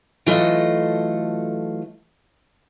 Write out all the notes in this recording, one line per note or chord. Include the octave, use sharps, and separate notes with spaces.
E3 F#3 A3 F4 A4 D#5